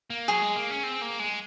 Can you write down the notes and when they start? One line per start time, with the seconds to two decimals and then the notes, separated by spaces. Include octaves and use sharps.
0.10 A#3
0.28 F#3 G#4
0.42 G#3
0.56 A#3
0.70 C#4
0.83 C4
1.02 A#3
1.19 G#3